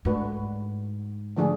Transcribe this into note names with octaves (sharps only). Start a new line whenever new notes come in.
G#2 A3 D4 F#4 B4
D3 F3 A3 D4 G#4